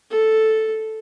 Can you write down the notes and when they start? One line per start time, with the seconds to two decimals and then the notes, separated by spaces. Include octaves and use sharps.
0.10 A4